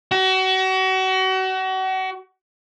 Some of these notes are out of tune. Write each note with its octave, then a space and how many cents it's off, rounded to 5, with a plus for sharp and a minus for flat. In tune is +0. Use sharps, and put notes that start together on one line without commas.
F#4 +35